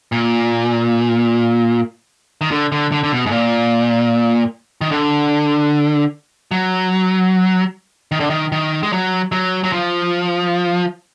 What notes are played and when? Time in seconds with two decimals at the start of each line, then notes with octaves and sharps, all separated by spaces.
0.12 A#2
2.41 D#3
2.51 D3
2.72 D3
2.92 D3
3.03 D3
3.12 B2
3.26 G#2
3.31 A#2
4.81 D#3
4.91 D3
6.51 F#3
8.12 D#3
8.20 D3
8.30 D#3
8.52 D#3
8.83 G#3
8.93 F#3
9.32 F#3
9.64 F#3
9.73 F3